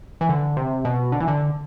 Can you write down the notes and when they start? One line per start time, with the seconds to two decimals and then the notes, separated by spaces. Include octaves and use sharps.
0.21 E3
0.29 D3
0.57 C3
0.85 B2
1.12 D3
1.20 E3
1.28 D3